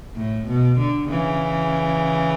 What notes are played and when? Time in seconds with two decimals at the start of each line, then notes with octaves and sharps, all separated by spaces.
0.15 A2
0.47 B2
0.78 D3
1.10 C#3 E3